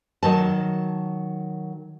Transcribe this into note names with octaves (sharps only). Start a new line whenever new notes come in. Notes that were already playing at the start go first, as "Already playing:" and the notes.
D#3 F#3 A5